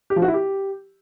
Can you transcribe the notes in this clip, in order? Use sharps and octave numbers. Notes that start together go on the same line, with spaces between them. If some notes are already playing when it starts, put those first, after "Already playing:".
G4
F3
F#4
E4
G4